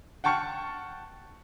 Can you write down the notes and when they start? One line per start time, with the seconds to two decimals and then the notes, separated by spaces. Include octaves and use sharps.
0.24 F#5 G5 A5 C#6 F6 C#7